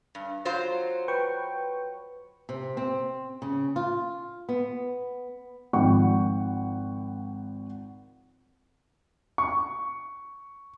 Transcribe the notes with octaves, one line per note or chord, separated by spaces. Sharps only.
G2
F#3 F4 C5
B4 G5 C#6
C3
C4
C#3
F4
B3
G#1 F3 F#5 G5 C#6
C#6